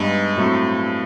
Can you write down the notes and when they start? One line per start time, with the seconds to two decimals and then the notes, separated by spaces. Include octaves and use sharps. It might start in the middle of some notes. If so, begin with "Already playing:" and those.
Already playing: G2 G#3 B3 D#4
0.37 A2 F#3 A3 C4